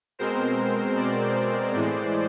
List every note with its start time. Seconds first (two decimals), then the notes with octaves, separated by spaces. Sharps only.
0.19 B2 G#3 C4 A#4 C5
0.97 C5 D5
1.75 A2 E3 G#3